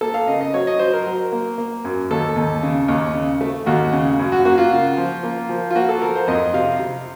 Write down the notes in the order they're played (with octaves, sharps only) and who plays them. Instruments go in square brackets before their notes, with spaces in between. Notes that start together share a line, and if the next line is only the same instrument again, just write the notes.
[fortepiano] A#3 A4
F5
C#3 D#5
D#5
F#3 C#5
D#5
F#3 C5
A#4
F#3
A#3
A#3
F#2
D#2 A4
D#2
C#3
D#2
C#3
A3
D#2 F#4
C#3
F#2
F#4
A#3 F#4
F4
C#3
F3
A#3
F3
F4
A#3 F#4
A4
F3 A#4
C5
F2 D#5
C3 F5
C3